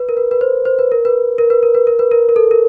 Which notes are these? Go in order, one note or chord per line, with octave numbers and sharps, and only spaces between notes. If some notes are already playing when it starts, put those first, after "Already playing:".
Already playing: B4
A#4
B4
B4
C5
C5
B4
A#4
B4
A#4
B4
A#4
B4
A#4
B4
A#4
A#4
A4
A#4